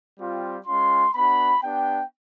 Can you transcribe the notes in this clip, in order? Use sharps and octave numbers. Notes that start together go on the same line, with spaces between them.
G3 C4 F4
G#3 C#4 F4 C6
B3 D4 F#4 B5
B3 D4 G4 G5